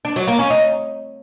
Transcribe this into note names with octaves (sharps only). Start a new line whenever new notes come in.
D4
F#3
A#3
C#4
D#4